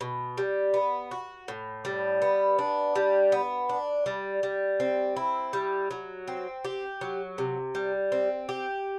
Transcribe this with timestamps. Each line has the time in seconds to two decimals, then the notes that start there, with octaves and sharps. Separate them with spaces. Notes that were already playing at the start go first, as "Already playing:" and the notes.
0.01 B2
0.38 G3
0.74 B3
1.11 F#4
1.48 A2
1.85 G3
2.22 B3
2.58 D4
2.96 G3
3.32 B3
3.69 D4
4.06 G3
4.43 G3
4.80 C4
5.16 E4
5.53 G3
5.91 F#3
6.28 C4
6.64 G4
7.01 F#3
7.38 C3
7.75 G3
8.12 C4
8.49 G4